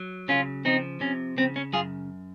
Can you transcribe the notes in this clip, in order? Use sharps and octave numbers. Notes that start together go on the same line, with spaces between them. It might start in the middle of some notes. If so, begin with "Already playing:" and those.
Already playing: F#3
C#3 C#4 F4
F3 C4 D#4
C3 C#4
C#3 C4
C#4
F#2 F4 G#4